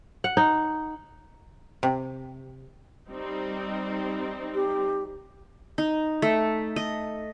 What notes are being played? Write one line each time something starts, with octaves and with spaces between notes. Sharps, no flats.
F#5
D#4
C3
G3 C4 D#4
G4
D#4
A3
D#5